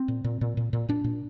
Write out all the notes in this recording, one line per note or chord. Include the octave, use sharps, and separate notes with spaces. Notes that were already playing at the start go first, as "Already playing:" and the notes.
Already playing: C4
A#2
A#2
A#2
A#2
A#2
A#2 D4
A#2